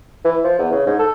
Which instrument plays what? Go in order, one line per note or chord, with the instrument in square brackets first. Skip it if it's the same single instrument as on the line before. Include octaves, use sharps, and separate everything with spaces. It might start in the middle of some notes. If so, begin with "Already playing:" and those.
[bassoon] E3
F3
E2
C#3
G#2
A4